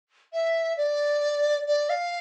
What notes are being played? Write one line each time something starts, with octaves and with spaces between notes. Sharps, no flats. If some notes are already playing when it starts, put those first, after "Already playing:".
E5
D5
D5
F5